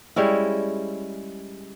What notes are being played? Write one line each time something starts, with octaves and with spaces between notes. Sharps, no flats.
G3 G#3 C#4 E4